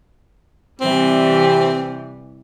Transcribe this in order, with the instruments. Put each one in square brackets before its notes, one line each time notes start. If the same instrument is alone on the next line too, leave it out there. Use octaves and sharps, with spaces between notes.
[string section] C3 E3 G3 [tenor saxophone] C4